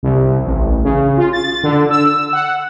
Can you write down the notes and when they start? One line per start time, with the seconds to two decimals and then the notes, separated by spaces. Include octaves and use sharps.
0.03 C2
0.45 A1
0.84 C#3
1.17 F4
1.33 A6
1.63 D3
1.91 E6
2.33 F#5